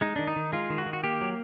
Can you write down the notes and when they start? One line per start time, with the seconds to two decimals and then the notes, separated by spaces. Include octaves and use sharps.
0.01 G#3 D#4
0.16 D#3 D4
0.27 D#4
0.36 D#3
0.52 G#3 F4
0.70 D#3
0.78 F#4
0.86 D#3
0.93 F#4
1.04 A#3 G4
1.21 F#3